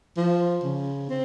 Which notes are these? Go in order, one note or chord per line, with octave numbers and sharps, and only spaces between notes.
F3
C#3
C4